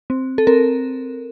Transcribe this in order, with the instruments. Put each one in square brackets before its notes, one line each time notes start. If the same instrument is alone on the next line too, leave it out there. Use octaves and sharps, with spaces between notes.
[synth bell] C4
A4
C4 A#4